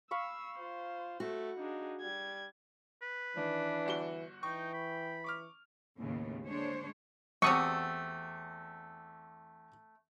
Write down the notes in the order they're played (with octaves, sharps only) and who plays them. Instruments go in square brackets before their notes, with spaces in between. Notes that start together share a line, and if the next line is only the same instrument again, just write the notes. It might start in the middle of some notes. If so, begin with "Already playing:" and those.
[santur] F5 B5 C#6 [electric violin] E6
[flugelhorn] F4 [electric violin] C5
[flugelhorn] A3 [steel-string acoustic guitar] F#4
[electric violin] D4 G#4 [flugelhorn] D#4
[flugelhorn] G3 [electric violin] G#6
[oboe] B4
[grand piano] D#3 [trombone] E3 [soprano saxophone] D4
[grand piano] G1 F#4 G7
[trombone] E3 [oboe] D#4 [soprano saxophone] G5 [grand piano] C#6
[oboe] B5
[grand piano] C#6 D6 F6
[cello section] D#2 A2 C#3 B3
D3 G#3 D4 C5 C#5
[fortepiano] E2 C4 [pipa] A3 F#4 G4 [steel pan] C#6 D#6